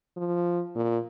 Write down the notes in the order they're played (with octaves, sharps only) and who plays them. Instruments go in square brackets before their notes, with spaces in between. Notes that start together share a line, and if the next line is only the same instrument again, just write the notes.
[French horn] F3
A#2